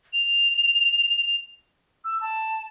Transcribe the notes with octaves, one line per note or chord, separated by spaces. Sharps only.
F7
E6
A5